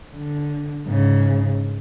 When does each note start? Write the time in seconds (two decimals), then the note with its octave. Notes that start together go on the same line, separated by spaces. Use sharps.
0.15 D3
0.86 G#2 C#3